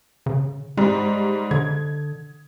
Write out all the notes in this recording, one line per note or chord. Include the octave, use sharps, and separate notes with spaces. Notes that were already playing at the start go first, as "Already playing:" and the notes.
C#3
G#2 G3 G#3
D3 G#6